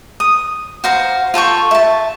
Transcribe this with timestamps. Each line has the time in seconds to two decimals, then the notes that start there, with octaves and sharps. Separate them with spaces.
0.20 D#6
0.84 F#4 C5 F5 A#5
1.34 F4 A4 G5 C#6
1.71 E5 A5